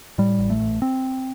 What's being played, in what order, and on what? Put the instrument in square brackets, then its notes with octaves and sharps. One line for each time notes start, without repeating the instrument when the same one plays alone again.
[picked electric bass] A2 G3
A1
A3
A1
C4